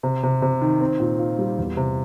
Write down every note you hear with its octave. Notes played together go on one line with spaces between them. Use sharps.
C3
C3
C3
D#3
C4
A#2
F4
G3
E2
C3